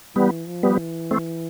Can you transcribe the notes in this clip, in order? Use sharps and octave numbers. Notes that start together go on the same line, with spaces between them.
E3 G3 B3
F3
G3 B3
E3
A3 C4